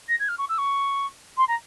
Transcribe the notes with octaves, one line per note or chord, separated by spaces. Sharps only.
A#6
G#6
F6
C#6
E6
C#6
C6
A#5